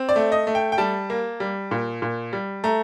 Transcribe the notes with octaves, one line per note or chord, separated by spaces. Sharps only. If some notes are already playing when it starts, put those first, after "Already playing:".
Already playing: C4
D5
A3
D#5
A3
G5
G5
G3 A5
A#3
G3
A#2
A#2
G3
A3 A#5